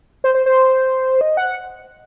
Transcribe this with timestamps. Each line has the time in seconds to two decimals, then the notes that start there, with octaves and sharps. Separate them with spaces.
0.24 C5
0.34 C5
0.46 C5
1.21 D#5
1.37 F#5